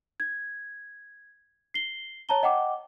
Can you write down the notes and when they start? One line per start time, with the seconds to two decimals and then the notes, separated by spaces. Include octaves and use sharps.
0.20 G#6
1.74 C7 G7
2.29 C#5 A5 A#5 G7
2.43 D#5 F#5 G5 D6